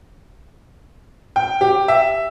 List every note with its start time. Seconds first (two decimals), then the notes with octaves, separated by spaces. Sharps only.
1.36 G5
1.61 G4
1.88 E5